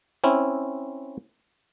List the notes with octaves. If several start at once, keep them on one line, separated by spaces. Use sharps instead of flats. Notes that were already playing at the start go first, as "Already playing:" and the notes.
C4 C#4 E4